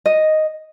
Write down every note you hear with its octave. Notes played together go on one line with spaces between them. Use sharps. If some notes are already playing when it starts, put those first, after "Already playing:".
D#5